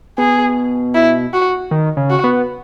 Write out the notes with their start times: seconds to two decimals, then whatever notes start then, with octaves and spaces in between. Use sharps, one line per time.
0.18 B2 G#4
0.94 E4
1.34 F#4
1.71 D#3
1.97 C#3
2.10 F#4
2.24 B3